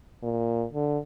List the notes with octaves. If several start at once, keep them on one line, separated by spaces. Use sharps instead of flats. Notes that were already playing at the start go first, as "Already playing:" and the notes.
A#2
D3